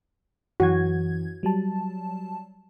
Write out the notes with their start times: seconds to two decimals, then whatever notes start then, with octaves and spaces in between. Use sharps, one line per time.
0.60 F#2 E3 F#4 G#6
1.43 F#3 G3 A5